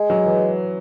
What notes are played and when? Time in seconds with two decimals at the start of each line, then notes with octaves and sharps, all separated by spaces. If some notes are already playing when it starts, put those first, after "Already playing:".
Already playing: G#3
0.10 F#3
0.26 E3